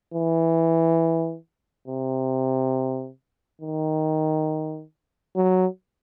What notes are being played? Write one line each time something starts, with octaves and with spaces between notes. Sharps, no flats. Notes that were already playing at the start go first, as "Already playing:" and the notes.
E3
C3
D#3
F#3